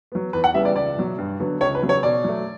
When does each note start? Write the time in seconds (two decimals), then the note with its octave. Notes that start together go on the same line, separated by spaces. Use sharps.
0.12 F#3 B3
0.33 E2 B4
0.44 F#5
0.54 C#3 E3 G3 B3 E5
0.65 D5
0.75 C#2 D5
0.97 B2 F#3
1.18 G2
1.40 D3 F#3 B3
1.61 C#2 C#5
1.75 B4
1.82 C#3 F#3 B3
1.89 C#5
2.03 B2 D5
2.24 F#3 A3